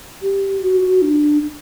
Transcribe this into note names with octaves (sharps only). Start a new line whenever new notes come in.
G4
F#4
F#4
D4